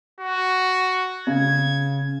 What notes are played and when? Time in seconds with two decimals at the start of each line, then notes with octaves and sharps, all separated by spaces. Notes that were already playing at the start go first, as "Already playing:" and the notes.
0.20 F#4
1.27 C#3 G#6